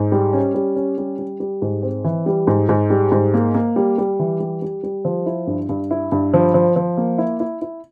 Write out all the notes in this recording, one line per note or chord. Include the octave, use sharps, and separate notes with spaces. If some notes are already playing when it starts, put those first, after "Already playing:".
Already playing: G#2
G3
C#4
G3
C#4
G3
G3
G3
G#2
C4
E3
G3
G#2
G#2
G3
G#2
A#3
A#3
G3
G3
E3
G3
G3
G3
F3
E4
G2
G2
E4
G2
F3
F3
F3
A#3
E4
E4
E4